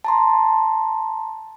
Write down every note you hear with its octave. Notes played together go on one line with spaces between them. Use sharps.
A5 A#5 C6